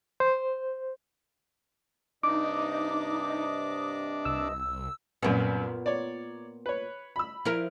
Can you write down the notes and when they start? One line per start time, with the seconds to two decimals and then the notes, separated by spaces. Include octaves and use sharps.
0.20 C5
2.23 G2 C3 D4 D#4 D#5 D6
4.25 C2 E6
5.23 C2 F#2 A#2 B3
5.86 C#5 D5
6.66 B4 C#5
7.16 B5 E6
7.45 F3 E4 A#4